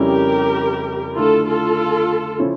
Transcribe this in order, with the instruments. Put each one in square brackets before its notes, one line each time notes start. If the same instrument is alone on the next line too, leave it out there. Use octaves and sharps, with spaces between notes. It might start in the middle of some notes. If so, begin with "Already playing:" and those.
Already playing: [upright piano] F2 C#3 G3 C#4 E4 [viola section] G4 A#4
[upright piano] D3 A3 E4 [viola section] F4 A4
[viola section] F4 A4
[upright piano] C#3 F3 C#4 E4